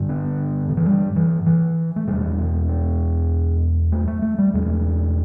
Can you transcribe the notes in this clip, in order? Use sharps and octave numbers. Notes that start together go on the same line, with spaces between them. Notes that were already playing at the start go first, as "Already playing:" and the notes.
Already playing: G2 D3
B3
D3
E3
G3
E3
E3
A3
E2 B2 G3
B3
B3
A3
A3
A3
G3
E2 B2 A3